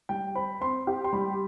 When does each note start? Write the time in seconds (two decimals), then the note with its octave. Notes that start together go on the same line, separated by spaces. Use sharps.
0.09 G3 G5
0.35 C5 B5
0.61 C4 C6
0.87 G4
1.04 C6
1.13 G3 B5